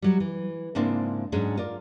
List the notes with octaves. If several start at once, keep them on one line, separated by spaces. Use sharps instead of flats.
F#3 G3
E3
G#2 C#3 A#3 C4 D4 E4
G#2 F#3 G#3 C#4 D4 G#4
F4 A#4 D5